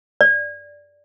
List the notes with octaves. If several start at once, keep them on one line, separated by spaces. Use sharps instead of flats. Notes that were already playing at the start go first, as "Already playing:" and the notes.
D5